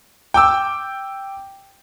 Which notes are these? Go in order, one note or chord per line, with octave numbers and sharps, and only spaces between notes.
G5 D6 E6